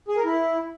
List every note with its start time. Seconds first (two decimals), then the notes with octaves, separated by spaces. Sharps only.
0.08 G#4
0.17 A#4
0.25 E4